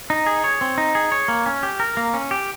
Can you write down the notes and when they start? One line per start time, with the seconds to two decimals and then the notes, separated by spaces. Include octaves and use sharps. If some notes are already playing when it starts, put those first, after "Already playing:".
0.10 D#4
0.27 G#4
0.44 C#5
0.61 C4
0.78 D#4
0.95 G#4
1.12 C#5
1.28 A#3
1.46 C#4
1.63 G4
1.80 A#4
1.97 A#3
2.14 C#4
2.31 G4